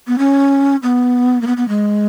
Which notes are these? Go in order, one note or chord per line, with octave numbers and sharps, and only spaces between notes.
B3
C#4
B3
A#3
B3
B3
G#3